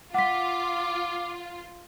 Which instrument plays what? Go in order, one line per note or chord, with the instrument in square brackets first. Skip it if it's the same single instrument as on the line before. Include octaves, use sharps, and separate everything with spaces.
[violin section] F4 [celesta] F#5 B6 [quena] D6